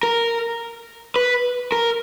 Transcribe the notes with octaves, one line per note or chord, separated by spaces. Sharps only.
A#4
B4
A#4